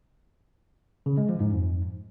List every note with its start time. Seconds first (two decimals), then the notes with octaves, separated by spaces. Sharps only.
1.06 C#3
1.17 G#3
1.29 F3
1.40 G#2
1.52 F2